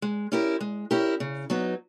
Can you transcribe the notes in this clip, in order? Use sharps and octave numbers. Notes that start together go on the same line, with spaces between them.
G#3
C#4 E4 G4 A#4
G#3
C#4 E4 G4 A#4
C#3
F#3 B3 D#4